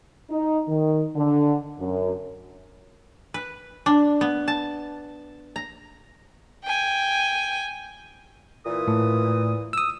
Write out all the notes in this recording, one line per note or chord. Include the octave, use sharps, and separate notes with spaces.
D#4
D#3
D3
F#2
B4
D4
B3
A5
A#5
G5 G#5
A#2 E3 D#6
A2
D#6 E6